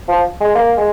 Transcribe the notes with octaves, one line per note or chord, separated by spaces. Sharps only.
F3
G#3
A#3
G#3